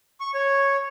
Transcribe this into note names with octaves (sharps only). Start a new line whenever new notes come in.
C#6
C#5